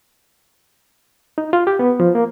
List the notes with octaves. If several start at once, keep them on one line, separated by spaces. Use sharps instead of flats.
D#4
F4
G4
B3
F3
A#3